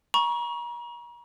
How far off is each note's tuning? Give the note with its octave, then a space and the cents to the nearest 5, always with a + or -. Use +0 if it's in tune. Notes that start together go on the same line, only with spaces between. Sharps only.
A#5 +40 C#6 +0